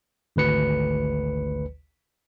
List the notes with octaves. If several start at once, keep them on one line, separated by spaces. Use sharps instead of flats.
G#1 D2 B4 C#7